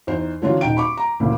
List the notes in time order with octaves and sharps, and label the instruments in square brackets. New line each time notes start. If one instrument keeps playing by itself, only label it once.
[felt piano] E2 D#4 C5
D3 E3 F#3 C#4 D4 F4
D#1 D#4 G5 D7
B5 C#6 D6
A#5
D2 A#2 C#3 E3